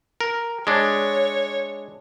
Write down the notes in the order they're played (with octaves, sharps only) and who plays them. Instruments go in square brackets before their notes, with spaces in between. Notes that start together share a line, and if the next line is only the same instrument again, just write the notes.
[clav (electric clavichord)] A#4
[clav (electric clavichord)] G#3 D4 [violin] C#5